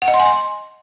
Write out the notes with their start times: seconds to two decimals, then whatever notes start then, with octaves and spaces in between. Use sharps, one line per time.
0.02 F#5
0.08 D#5
0.14 C6
0.20 G#5
0.26 C6